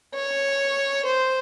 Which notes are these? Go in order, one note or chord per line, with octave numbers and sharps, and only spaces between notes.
C#5
C5